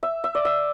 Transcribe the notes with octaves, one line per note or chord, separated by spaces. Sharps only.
E5
E5
D5
E5